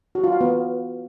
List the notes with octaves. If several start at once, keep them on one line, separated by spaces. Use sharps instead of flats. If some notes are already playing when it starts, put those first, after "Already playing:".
F#4
F4
F5
B3